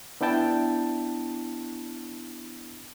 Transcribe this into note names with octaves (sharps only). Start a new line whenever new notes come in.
B3 D4 E4 G5 A5